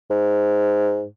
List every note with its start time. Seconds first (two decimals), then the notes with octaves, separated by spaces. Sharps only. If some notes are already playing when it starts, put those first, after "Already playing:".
0.10 G#2